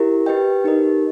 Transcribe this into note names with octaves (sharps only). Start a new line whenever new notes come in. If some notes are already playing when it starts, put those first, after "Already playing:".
Already playing: E4 G4 A#4
G4 B4 D#5 G5
D#4 G4 A#4 D#5